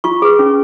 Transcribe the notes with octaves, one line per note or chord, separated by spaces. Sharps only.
F4 C#6
G#4 B4
C#4